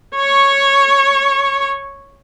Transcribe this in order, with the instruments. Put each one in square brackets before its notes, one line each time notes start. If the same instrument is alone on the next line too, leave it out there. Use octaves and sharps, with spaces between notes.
[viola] C#5 C#6